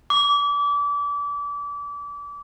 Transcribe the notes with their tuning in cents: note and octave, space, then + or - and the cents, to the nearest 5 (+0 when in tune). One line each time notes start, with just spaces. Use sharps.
D6 -30